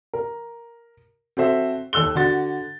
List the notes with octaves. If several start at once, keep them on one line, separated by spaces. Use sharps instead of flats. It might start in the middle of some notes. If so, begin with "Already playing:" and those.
A#4
C4 F#4 A4 C5 E5
D#2 A4 E6 F#6 G7
D3 F#4 A6